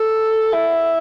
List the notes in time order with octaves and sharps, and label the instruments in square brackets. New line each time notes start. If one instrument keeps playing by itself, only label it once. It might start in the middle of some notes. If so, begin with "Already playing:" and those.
Already playing: [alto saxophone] A4
E4